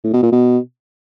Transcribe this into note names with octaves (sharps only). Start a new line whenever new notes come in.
A2
B2
A#2
B2